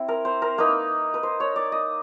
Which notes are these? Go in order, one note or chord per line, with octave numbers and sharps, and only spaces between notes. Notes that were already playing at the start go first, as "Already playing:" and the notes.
Already playing: C4 E4
A#4
C5
A#4
A#3 D#4 B4
B4
C5
C#5
D5
D#5